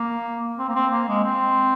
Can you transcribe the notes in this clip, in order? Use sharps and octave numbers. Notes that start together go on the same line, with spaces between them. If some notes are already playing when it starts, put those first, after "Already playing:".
Already playing: A#3
C4
A#3
C4
A#3
G#3
C4